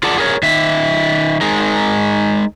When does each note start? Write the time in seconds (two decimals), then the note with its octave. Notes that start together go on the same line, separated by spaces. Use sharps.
0.03 F4 G#4 A#4 D5 F#5 A5
0.18 G#4 A#4 C#5
0.43 D#3 E5
1.41 G#3 D#4 A#4